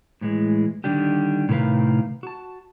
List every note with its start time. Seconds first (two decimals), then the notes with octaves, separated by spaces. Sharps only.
0.21 A2 E3 G#3
0.84 D3 D#3 G3 D4 G4
1.49 A2 C3 D#3 A#4 B4 F5
2.23 F#4 A5